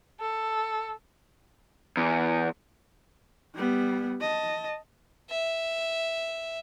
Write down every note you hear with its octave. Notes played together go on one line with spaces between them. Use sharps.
A4
E2
G3 B3
D#5 A5
E5